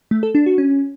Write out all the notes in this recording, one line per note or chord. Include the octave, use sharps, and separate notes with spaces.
A3
A4
D4
F#4
C#4